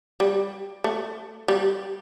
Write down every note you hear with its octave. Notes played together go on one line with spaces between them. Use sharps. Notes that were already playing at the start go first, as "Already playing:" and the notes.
G3
A3
G3